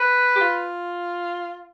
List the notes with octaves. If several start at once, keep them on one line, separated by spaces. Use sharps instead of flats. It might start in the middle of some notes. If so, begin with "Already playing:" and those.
Already playing: B4
G4
F4